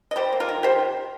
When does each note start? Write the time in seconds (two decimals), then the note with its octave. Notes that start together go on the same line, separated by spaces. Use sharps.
0.11 D#5
0.16 G3 G4 C5
0.32 A#3
0.40 F4 A#4
0.48 D#3
0.63 D#3 G4 C5